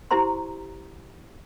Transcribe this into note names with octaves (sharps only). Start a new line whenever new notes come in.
E4 G4 C5 A#5 C6